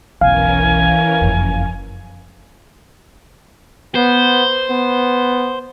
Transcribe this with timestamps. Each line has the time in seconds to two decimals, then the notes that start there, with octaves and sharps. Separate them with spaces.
0.21 F1 B1 E3 C#4 A#4 F5 G#5
1.21 F#1 F2
3.95 B3 C5
4.70 B3